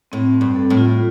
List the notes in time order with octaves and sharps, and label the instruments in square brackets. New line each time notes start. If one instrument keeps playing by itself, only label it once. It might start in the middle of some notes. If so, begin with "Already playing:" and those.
[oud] A2 [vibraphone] C4
[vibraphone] C4
[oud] G2
[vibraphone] A4
[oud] A2
[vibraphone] F4